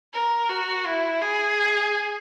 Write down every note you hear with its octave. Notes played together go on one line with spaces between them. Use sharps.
A#4
F#4
E4
G#4